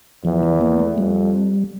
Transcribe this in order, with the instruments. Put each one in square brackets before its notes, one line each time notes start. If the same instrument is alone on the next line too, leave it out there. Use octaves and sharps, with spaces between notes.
[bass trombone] E2 [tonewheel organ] F3
[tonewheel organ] E3
A#3
A3
[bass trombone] F2 [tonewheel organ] G3